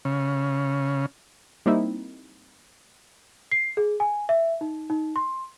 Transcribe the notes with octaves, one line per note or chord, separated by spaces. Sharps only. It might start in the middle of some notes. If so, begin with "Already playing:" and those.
C#3
G3 A#3 C4 D#4 E4
C7
G#4
G#5
E5
D#4
D#4
C6